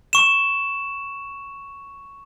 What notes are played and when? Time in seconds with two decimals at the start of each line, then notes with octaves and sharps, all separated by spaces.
0.13 C#6 E7